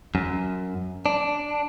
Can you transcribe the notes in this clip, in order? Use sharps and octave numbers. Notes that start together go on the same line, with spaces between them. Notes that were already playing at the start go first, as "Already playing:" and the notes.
F#2
D4